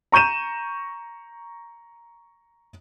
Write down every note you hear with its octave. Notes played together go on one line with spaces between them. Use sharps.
A#5 C#6 G6 D#7 E7